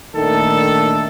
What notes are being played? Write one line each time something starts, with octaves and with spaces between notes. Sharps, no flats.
A#2 D#3 A3 D4 A4